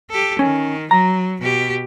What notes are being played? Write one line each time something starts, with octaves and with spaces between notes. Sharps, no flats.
G4 A4
D#3 C#4
F#3 A#5
B2 G4